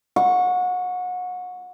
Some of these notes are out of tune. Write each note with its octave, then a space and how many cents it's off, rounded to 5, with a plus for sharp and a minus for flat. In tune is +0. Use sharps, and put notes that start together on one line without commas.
F#5 -30 C#6 +5